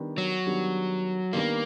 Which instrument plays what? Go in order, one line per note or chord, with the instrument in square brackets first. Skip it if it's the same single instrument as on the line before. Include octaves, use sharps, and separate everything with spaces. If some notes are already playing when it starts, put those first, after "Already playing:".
Already playing: [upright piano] D#3 G3 B3 D4
[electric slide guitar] F#3
[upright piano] D#3 G3 B3 D4
[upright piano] D#3 G3 B3 D4 [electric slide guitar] A#3